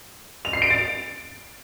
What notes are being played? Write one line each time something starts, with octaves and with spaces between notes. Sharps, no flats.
F7
C7
D7
A6